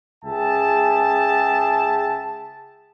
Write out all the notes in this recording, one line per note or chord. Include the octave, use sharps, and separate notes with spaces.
C#2 G#4 E5 G5 A5